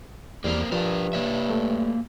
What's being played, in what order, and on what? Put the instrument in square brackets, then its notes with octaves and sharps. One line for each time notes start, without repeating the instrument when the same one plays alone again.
[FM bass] E2 [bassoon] G3 [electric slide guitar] A#3 C4 A#4
[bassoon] G2 [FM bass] F3 [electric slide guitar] D4 A#4
[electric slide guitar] A#3 C#5 E5
[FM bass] A3